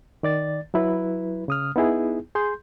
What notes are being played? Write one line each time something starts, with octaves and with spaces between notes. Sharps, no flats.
D#3 D5 A6
F#3 E4 B4
C#3 D#6 F6
B3 D#4 E4 G#4
G#4 C6 G6